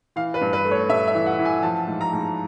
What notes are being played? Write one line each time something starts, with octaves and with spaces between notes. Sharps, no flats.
E3 F5
B4
G2
B4
A3
C#5
G2 E5
E5
E3
F#5
E3
G#5
F3 A5
G#2
A#5
G#2